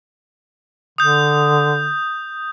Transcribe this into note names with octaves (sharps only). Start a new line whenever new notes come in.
D3 D#6 G6